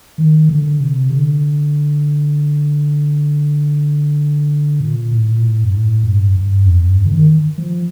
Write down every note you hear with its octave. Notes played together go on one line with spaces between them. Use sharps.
D#3
D3
C3
D3
A#2
A2
A#2
A2
G2
A2
G2
G2
F2
G2
D3
D#3
F3